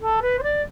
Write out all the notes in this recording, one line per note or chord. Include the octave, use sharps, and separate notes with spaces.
A4
B4
C5
D5